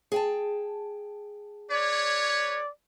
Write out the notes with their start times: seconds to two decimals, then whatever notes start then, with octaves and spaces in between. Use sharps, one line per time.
0.12 G#4 G5 A5
1.71 B4 C#5 D5